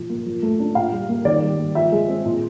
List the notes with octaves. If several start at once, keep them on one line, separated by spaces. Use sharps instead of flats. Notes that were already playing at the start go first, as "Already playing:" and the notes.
Already playing: A#2 F3
A#3
F3
A3
D4
A#2 F5
G3
A#3
D#3 D5
G3
A#3
F3 E5
G#3
C4
A#2